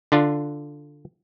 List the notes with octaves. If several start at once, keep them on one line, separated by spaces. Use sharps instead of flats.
D3 D4 F4